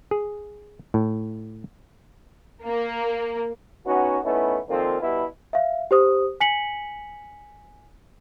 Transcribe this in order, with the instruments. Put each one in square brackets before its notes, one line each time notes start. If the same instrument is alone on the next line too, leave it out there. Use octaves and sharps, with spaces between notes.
[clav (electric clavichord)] G#4
A2
[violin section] A#3
[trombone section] B3 C#4 D#4 F#4
A3 B3 C#4 D#4 E4
A#2 D#3 F3 C4 F4 A4
B2 G3 B3 E4
[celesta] E5 F5
G4 C5 D#6
G#5 B6 C#7 F#7